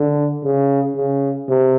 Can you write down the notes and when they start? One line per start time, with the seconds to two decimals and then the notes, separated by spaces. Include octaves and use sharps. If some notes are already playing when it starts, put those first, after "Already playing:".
Already playing: D3
0.45 C#3
0.96 C#3
1.48 C3